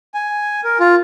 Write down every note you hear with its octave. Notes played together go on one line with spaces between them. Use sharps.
G#5
A#4
F4